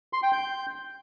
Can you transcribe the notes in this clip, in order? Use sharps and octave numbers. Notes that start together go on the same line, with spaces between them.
C6
G5
G6